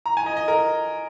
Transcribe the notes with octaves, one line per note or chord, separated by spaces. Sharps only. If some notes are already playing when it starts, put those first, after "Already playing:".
A#5
G#5
D#5
D#5
A#4